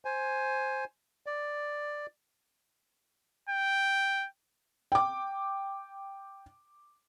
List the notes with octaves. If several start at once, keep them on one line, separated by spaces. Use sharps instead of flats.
C5 G#5
D5
G5
G5 D6